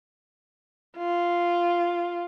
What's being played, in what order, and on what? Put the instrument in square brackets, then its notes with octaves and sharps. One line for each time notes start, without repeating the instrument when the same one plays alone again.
[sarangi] F4